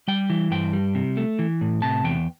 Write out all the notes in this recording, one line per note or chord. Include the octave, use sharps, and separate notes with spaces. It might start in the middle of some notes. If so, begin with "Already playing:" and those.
G3 G5
E3
G2 G5
G3
C3
A3
E3
A2
C3 A5
E2 G5